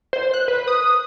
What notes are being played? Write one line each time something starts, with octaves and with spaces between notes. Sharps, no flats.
C5
F#6
B4
D#6